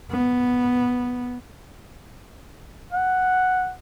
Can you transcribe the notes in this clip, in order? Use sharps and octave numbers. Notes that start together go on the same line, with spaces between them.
B3
F#5